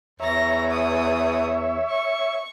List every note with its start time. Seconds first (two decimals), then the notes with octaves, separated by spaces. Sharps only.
0.20 E2 C#5 E5 A#5 A#6
0.70 D#6
1.89 C#6